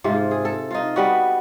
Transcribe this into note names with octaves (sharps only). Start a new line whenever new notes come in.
G#2 C3 F4
G#4
A4
D#4 F4
G3 B3 F#4